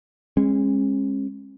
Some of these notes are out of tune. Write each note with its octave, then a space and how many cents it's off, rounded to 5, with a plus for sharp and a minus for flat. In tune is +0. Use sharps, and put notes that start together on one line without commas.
G#3 -15 C#4 -35